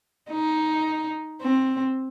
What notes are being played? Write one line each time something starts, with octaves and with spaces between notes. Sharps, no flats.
D#4
C4